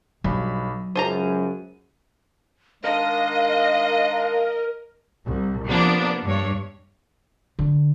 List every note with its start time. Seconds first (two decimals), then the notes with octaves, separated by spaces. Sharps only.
0.24 B1 G2 F#3 B5
0.96 C#2 F#2 C#3 C5 A5 A#5 D#7
2.84 D#3 G#3 D4 A#4 D#5 F5
5.25 C2
5.66 C3 F3 A#3 B3 D4
6.25 G2 C#5
7.59 D3